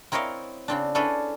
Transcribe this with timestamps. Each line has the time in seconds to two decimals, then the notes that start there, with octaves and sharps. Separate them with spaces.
0.12 C4 E4 A#4 C#5 D#5 F5
0.68 C#3 C4 D4
0.95 C#4 D4 E4 G#4 A4 B4